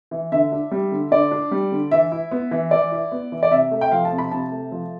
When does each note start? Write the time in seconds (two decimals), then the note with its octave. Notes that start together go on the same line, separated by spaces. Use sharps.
0.11 E3
0.32 D3 E5
0.52 D4
0.71 G3
0.92 D3
1.11 D3 D5
1.31 D4
1.51 G3
1.72 D3
1.91 E3 E5
2.12 E4
2.31 B3
2.51 E3
2.71 E3 D5
2.92 E4
3.12 B3
3.32 E3
3.43 D5
3.51 C3 E5
3.71 A3
3.81 G5
3.92 F3 F5
4.05 A5
4.12 C3
4.18 B5
4.31 C3 A5
4.52 A3
4.72 F3